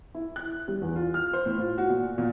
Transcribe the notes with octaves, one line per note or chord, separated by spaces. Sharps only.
E4
F#6
G3
E2
F4
F6
C5
A2
F4
F#4
A#2
A#2